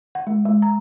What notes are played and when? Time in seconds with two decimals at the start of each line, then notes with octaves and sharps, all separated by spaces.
0.15 F#5
0.27 G#3
0.45 G#3
0.62 A#5